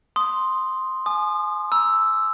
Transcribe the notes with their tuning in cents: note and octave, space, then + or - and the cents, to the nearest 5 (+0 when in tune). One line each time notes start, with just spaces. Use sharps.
C6 +0 D#6 +0
G#5 +30 D#6 -35
A#5 +35 E6 +0